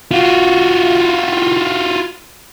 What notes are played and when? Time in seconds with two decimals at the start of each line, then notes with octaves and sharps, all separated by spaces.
0.12 F4 F#4